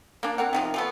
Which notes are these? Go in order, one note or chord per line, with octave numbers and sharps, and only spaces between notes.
A#3 D4
C4 A#4 F#5
C3 D#3 F3
F3 A3 B3